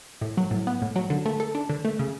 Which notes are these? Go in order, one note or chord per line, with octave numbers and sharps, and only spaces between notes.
A2
F#3
A2
B3
A2
F#3
D3
A3
A4
D4
D3
A3
C#3